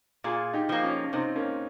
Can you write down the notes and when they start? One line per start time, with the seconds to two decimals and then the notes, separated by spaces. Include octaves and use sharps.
0.24 A#2 F4 G#4
0.53 D#4 G4
0.69 F3 A#3
0.84 C#4 F4
1.04 C#4
1.13 C3 C4 D#4
1.35 A#3 C#4